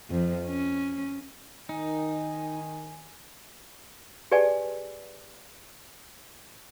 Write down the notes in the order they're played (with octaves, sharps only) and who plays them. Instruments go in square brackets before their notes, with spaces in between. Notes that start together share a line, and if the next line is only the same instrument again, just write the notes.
[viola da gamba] F2
C#4
[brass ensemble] D#3 [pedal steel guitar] D#4 [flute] G#5
[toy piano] G4 G#4 B4 D5 G#5 A5